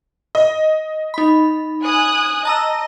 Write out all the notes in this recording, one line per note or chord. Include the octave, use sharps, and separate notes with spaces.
D#5
D#4 B5
G#5 D#6 F#6
D#5 A5 A#5 E6